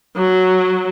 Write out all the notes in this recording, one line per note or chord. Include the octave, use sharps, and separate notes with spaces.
F#3